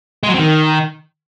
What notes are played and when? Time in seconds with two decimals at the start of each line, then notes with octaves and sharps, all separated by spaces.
0.23 G#3
0.29 F#3
0.34 C4
0.39 D#3